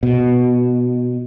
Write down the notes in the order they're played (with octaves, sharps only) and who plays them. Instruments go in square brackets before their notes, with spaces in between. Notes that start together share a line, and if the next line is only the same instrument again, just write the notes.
[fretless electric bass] B2